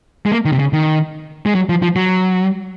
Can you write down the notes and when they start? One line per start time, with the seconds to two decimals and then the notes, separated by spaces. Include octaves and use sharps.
0.26 G#3
0.32 A#3
0.45 D#3
0.52 C3
0.59 C#3
0.73 D#3
1.46 G#3
1.55 F#3
1.69 F3
1.82 F3
1.96 F#3